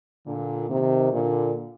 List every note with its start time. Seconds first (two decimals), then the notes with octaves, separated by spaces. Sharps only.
0.26 A#2 D3
0.69 C3 D#3
1.13 A#2 D3